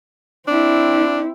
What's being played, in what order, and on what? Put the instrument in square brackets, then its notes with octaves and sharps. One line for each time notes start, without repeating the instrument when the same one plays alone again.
[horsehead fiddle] C4 E4 [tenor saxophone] D4